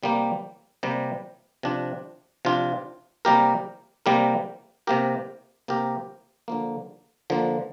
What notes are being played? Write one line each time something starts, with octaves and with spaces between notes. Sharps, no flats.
C3 G3 A#3 G4
C3 G3 A#3 G4
C3 F3 D4 F4
C3 F3 D4 F4
C3 G3 A#3 G4 A#4
C3 G3 A#3 G4 A#4
C3 A#3 G4 A#4
C3 A#3 G4 A#4
D3 F3 A#3
D3 F3 A#3